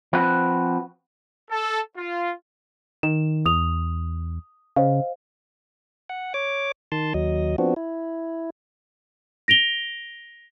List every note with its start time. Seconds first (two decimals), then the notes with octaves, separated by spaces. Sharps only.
0.13 F3 C4 F#4 B4
1.51 A4
1.97 F4
3.03 D#3 E7
3.46 E2 D#6 F7
4.76 C#3 C5 D#5 F5
6.09 F#5
6.34 C#5 D6
6.92 D#3 A5 C6
7.14 D#2 F#3 D#5
7.58 F3 B3 C4 D4 F#4
7.76 E4
9.48 A#6 D7 F7 G7